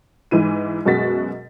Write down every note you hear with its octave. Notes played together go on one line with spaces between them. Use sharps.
G#2 E3 E4 D#7
F#2 B2 G#3 F#4 A6 B6